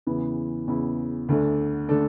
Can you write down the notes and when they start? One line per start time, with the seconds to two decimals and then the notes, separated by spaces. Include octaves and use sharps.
0.07 E2 C#3 E3 B3 E4
0.67 E2 C#3 E3 B3 E4
1.29 D2 D3 A3 D4 A4
1.89 D3 A3 D4 A4